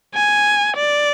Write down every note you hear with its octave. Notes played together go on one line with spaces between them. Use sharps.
G#5
D5